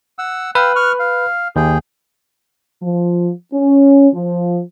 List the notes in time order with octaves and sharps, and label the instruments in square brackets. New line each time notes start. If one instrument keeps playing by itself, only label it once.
[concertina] F#5 E6
[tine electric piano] B4 [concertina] F5 G5 E6
[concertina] C#6 F6 F#6
F5
[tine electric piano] D#2 [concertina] G#4 G5
[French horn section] F3
C#4
F3